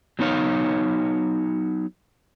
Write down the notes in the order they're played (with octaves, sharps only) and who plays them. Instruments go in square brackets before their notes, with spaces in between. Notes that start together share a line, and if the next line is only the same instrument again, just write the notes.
[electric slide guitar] F#3 B3 D#4 C#5 F5